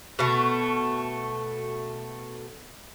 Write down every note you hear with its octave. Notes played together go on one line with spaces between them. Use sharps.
B2 A3